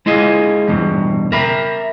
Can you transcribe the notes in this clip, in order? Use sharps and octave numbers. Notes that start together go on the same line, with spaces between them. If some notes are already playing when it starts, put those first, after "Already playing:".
G#3 E4 F4 G#4 D#5
E2 G2 B2
A#4 E5 B5